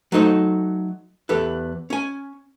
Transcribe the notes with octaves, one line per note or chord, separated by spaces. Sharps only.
F#3 A3 D#4 C5
E2 G4 A4 B4
C#4 G#5